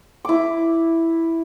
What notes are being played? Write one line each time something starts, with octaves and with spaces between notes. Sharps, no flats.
E4 D6